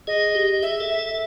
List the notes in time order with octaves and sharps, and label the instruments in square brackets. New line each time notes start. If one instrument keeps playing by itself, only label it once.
[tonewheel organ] G#4 [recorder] D#5
[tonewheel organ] G4
[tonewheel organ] G#4 [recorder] E5
[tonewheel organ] A4
[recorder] E5
[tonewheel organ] A4